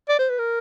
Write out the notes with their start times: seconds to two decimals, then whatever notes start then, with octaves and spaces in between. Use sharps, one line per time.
0.09 D5
0.19 C5
0.29 B4
0.39 A#4